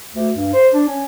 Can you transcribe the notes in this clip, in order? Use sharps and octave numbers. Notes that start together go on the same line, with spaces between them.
D2
G2
C5
D4
C#4